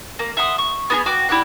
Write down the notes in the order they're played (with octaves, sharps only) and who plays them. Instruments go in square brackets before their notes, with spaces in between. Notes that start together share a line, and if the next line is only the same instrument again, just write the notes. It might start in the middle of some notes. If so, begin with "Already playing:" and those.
[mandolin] A#3
E5 F#5 C6 D#6
C#6
B3 F#4 G#4
F#4 G5 D6
E4 G4 D5 F#5